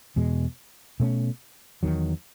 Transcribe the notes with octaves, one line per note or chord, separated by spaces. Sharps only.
E2 B2 G#3
B2 A3 C#4
E2 D#3 F#3